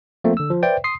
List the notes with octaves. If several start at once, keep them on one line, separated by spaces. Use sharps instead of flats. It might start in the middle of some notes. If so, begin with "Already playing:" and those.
F3 A3 A#3 C4
D3 E6
F3
B4 C5 D5 E5 G5
C6 D#6 C7